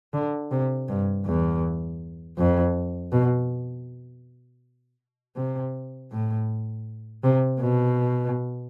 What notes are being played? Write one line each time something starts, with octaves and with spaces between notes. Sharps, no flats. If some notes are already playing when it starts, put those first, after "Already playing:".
D3
C3
G2
E2
F2
B2
C3
A2
C3
B2